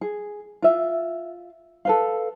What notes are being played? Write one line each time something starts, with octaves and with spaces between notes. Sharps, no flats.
G#4
F4 E5
A4 B4 F5